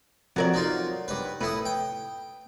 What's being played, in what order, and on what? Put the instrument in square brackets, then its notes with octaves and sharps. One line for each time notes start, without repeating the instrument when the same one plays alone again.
[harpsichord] F2 [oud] F#3 A#4 D5
[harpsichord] D#4 F4
G2 B4
[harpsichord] A2 E4 D#6 [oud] B4
[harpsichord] G5